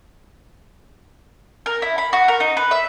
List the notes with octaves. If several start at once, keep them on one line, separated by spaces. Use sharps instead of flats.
A#4
E4
B5
F#4
A#4
D#4
B4
E5